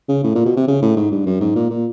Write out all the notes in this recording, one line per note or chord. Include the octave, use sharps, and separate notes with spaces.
C#3
A2
A#2
B2
C3
C#3
A2
G#2
G2
F#2
G#2
A#2
A#2